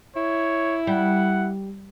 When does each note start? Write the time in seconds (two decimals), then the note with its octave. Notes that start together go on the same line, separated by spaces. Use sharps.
0.16 E4 C#5
0.87 G3 F#5